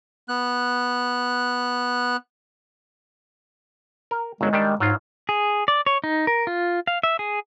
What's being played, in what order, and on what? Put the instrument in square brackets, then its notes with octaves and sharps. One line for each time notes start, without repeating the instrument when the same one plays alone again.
[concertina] B3 F#6
[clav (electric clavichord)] A#4
[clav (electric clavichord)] G1 F#2 F#3 [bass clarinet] G#3
[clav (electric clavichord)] D#3 G3 D4
[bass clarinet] G#2 [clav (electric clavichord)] F#3 F4
[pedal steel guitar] G#4
D5
C#5
D#4
A#4
F4
F5
E5
G#4